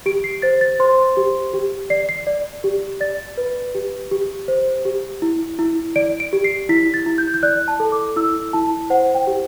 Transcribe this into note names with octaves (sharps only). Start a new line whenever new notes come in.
G4 D7
C7
C5 A6
A6
C5 C6
G4
G4
D5 C7
C7
D5
G4
D5 A6
B4
G4
G4
C5
G4
E4
E4
D5 D7
D7
G4
C7
E4 B6
A6
E4
G6
G6
D5 F#6
A5
A4
D6
E4 E6
E4 A5
C5 F#5
G5
G4